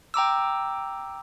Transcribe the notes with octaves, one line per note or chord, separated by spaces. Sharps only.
G5 A#5 D6 E6